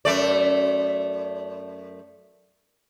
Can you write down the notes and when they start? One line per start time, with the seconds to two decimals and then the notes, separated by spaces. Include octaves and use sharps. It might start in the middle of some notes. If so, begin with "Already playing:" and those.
0.05 F#2 A3 D5